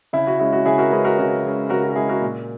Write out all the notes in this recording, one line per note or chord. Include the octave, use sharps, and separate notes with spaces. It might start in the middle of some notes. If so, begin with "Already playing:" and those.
C#3 E4
F#4
G#3 C#4 E4
F#4
C#3 E4 G#4
F#4 A#4
G#3 C#4 G#4 B4
F#4 A#4
C#3 F#4
G#3 C#4
C#3 F#4 A#4
F#4
A#4
G#3 C#4 E4 G#4
F#4 A#4
A#2